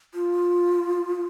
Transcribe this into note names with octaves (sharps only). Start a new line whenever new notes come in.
F4